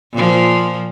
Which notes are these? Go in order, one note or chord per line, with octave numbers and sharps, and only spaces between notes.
A#2 F3